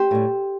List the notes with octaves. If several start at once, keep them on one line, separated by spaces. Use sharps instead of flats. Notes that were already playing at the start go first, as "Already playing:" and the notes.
Already playing: G4 C5
A2 G3